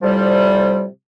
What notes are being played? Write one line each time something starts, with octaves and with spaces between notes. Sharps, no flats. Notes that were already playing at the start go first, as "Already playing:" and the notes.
A2 C3 F3 G3